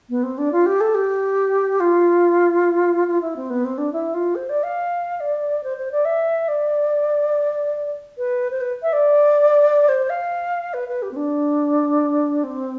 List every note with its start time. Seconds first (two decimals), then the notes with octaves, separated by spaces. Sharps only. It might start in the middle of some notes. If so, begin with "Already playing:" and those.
0.10 B3
0.23 C4
0.38 D4
0.52 F4
0.66 G4
0.80 A4
0.95 G4
1.80 F4
3.08 F4
3.21 E4
3.36 C4
3.50 B3
3.65 C4
3.78 D4
3.93 E4
4.14 F4
4.35 C5
4.49 D5
4.63 F5
5.20 D5
5.63 C5
5.77 C5
5.91 D5
6.05 E5
6.48 D5
8.18 B4
8.51 C5
8.61 B4
8.82 E5
8.93 D5
9.88 C5
10.09 F5
10.74 B4
10.88 B4
11.02 G4
11.11 C4
11.16 D4
12.44 C4